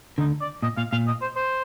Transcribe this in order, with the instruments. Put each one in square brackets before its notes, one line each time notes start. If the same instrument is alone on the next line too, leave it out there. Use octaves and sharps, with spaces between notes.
[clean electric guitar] D2 D3 [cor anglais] D#4
[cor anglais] D5
[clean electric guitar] A#2 [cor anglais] D#5
[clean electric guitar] A#2 [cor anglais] F5
[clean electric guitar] A#2 [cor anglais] F5
[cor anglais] D#5
C5
C5